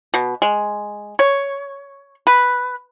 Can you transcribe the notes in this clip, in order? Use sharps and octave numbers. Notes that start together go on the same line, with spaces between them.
B2
G#3
C#5
B4